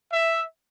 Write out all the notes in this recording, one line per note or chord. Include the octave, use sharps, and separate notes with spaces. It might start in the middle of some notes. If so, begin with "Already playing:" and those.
E5